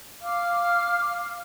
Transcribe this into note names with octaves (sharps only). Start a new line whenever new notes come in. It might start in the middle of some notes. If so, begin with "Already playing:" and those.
F5 D6 F6